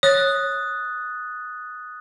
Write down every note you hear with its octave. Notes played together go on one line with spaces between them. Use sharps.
C#5 D#6 F#6 A6